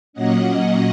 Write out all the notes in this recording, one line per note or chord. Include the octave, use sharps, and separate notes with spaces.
A#2 F#3 A#3 C#4 D#5 F#5